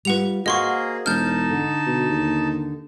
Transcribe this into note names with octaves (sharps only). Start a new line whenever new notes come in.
G3 F4 B4 F#5 F7
A#3 F#4 G#4 C5 D#5 F#5 C6 C#6
E1 D#4 A5 F6 G6
D3
B2
D#2